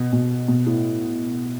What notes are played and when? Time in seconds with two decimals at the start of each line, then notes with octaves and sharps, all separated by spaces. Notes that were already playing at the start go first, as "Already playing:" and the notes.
Already playing: B2
0.13 B2
0.48 B2
0.66 A2